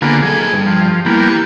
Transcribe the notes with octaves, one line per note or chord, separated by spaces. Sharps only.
D3 A#3 B3 F4 G#4
F#3 G#4 A4
G2
F3
E3 G3 A#3 B3